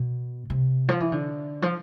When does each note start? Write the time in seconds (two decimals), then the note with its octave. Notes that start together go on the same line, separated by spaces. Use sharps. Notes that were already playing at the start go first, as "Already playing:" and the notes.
Already playing: B2
0.50 C3
0.88 F3
1.00 E3
1.12 D3
1.62 F3